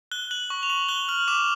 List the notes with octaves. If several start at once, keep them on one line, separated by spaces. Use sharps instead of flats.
F#6 G7
F#6 F#7
C#6
F7
C#6 F#7
F#6 G7
F6 F#7
D6 E7